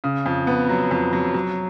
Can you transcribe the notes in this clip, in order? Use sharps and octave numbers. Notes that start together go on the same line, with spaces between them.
C#3
F2
B3
F#3
F2
F#3
F#3